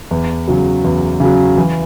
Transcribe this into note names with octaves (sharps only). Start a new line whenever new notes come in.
E2
C#3 F#3
E2
C#3 F#3
E3